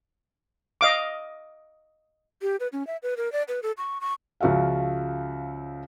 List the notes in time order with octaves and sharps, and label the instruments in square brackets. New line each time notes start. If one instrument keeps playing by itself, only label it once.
[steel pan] D#5 F5 D6
[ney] G4
B4
C#4
E5
B4
A#4
D5
B4
A4
C#6
C#6
[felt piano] C#2 F3 F#4 E5 F5